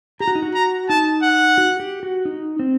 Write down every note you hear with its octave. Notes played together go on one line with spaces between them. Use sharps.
G4 A#5
F#4
D#4
F#4
A#5
D#4 A5
F#5
F#4
G4
F#4
D#4
C4